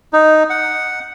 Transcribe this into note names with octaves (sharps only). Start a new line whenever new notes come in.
D#4
F#5